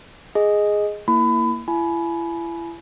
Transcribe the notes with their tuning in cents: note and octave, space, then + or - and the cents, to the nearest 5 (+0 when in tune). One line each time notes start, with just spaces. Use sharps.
G#4 +0 D#5 +0
A#3 +0 E4 +0 B5 +25
E4 +35 G#5 +30 B5 +0